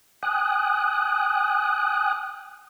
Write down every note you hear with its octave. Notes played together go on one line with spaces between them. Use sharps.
G5 G#5 D#6 F#6